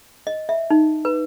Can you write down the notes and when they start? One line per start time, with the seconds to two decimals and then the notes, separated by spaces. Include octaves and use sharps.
0.27 D#5
0.49 E5
0.71 D#4
1.05 B4